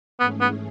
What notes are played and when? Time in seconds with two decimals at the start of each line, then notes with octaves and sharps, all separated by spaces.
0.20 G#2 E3 A3 B3 C#4 G#4
0.40 B3